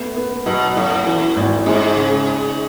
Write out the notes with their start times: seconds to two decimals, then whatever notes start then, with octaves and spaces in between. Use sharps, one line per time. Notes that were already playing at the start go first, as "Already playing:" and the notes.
Already playing: A3 B3
0.16 B3
0.46 B2 F#3
0.76 A2 F#3
1.07 E3
1.37 G#1
1.66 G#2 G#3
1.96 C#3